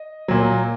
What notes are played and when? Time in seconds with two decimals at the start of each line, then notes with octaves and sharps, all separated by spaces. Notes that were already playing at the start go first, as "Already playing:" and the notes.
Already playing: D#5
0.28 A#2 F#3